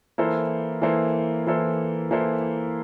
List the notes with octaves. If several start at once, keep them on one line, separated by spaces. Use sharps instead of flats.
E3 A#3 E4 A4 C5
E3 A#3 E4 A4 C5
E3 A#3 E4 A4 C5
E3 A#3 E4 A4 C5